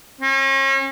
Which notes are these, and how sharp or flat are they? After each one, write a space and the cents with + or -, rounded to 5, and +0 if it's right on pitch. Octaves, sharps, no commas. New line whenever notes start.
C#4 -40